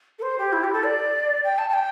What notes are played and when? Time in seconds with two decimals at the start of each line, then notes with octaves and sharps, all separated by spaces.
0.19 A4
0.22 C5
0.39 G4
0.53 E4
0.64 G4
0.73 A4
0.84 D5
1.44 G5
1.58 A5
1.69 A5
1.74 G5